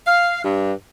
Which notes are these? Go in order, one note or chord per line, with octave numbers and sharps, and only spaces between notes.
F5
G2